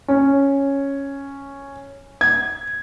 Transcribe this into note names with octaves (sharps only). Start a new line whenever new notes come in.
C#4
G#6